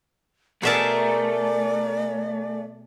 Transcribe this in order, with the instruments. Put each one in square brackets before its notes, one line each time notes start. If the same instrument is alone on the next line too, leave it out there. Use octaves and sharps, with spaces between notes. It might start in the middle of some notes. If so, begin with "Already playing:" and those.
[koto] B2 E5 A5 [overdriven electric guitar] A3 [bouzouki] G#4 A#4 [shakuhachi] D5